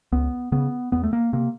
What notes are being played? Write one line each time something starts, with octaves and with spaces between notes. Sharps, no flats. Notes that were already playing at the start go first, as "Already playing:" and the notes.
C#2 B3
C#3 B3
E2 B3
A3
A#3
C3 A#3